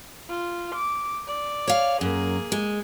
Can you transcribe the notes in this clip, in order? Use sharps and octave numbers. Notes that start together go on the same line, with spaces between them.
F4
D6
D5
C#5 F5
F#2 A#3 G#4
G#3